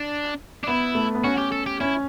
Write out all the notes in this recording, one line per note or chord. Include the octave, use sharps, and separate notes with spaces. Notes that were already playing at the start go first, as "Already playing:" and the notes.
Already playing: D4
D4
B3 E4
A3
B3
C#4 F#4
G4
A4
G4
C#4 E4